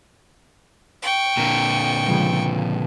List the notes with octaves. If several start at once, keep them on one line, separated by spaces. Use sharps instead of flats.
G5 C#6
A#2 D3 A#4
C#3 F3 G#3